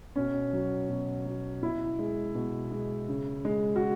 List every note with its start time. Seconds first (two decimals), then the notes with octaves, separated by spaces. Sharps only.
0.16 B2 C#4
0.53 F#3
0.89 B2
1.26 F#3
1.62 B2 E4
1.99 G#3
2.35 B2
2.71 G#3
3.08 C#3
3.45 G#3
3.76 F#4